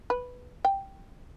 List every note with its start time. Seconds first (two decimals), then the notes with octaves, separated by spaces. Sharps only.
0.10 B4
0.65 G5